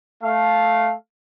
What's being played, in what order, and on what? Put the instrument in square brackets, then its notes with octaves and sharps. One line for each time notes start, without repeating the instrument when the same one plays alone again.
[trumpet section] A3 F5